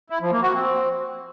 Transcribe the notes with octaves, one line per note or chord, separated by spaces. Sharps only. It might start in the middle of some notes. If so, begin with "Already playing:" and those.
E4
F3
A#3
F#4
C4